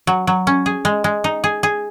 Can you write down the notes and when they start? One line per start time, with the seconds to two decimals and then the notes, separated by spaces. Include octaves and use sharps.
0.07 F#3
0.27 F#3
0.47 C#4
0.66 G#4
0.85 G#3
1.04 G#3
1.24 D#4
1.44 G#4
1.63 G#4